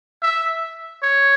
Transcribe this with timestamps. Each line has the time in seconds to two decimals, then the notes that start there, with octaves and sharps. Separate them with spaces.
0.22 E5
1.02 C#5